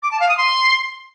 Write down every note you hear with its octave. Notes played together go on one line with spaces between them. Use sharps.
D6
A5
F5
D#6
C6